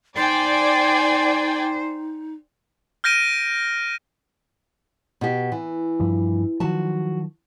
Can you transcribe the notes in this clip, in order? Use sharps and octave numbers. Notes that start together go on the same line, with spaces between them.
D#4 C5 D5 G5 G#5
F6 G6 A#6 D7 D#7
B2 G4
E3
G2 F3 G3
D#3 F3 F#3 F#4 A5